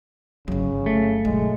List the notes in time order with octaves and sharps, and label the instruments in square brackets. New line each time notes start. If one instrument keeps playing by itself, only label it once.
[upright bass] G1 F#3 [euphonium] C#3
[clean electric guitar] A3
[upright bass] B1 [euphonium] G#3